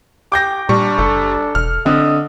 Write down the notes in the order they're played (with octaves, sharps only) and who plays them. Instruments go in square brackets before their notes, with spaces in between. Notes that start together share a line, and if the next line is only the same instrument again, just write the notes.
[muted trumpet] G4 [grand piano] D6 G6 A#6
[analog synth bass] A#2 [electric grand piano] G3 C#6 [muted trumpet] D4
[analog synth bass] F#1 [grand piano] A4
[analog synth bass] E1 [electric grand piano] F6
[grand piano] D3 [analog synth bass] C4 [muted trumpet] D#5